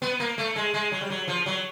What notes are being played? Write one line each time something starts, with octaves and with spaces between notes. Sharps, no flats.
B3
A#3
A3
G#3
G#3
F#3
G3
F#3
F3
F#3